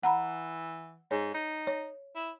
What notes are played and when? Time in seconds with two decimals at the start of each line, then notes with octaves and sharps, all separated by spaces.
0.03 E3 F#5 A#5 B5
1.11 G#2 C#5
1.34 D#4
1.67 C#5
2.15 E4